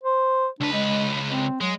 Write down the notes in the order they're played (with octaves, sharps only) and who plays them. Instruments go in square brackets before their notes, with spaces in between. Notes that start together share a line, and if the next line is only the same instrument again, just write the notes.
[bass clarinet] C5
[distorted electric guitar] C#2 B4 [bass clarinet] D4
[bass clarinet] G#3
C4
[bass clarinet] F#3 [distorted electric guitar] G#3